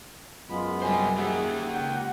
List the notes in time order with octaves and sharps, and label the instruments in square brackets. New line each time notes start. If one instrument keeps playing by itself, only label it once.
[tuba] F#2 [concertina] G#3 B3 B5 [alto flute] F4
[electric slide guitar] G3 C5 [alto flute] G#5
[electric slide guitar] A#3 G4 [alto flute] G#4 [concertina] E5 F#5
[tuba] C#2 [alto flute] F#5 [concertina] G5